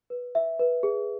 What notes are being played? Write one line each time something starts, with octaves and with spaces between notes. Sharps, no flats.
B4
E5
B4
G#4